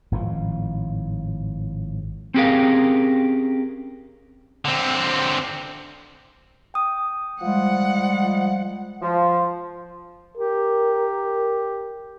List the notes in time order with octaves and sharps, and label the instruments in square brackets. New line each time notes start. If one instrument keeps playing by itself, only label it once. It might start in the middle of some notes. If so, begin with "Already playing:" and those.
[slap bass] G#1 A2 C#3 F3
[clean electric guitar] C4 C#4 G4 G#4 A#4 F5
[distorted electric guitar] D3 C4
[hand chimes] G5 D#6
[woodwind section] F3 G3 G#3 [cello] F#5
[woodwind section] F3
[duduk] G4 [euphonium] A#4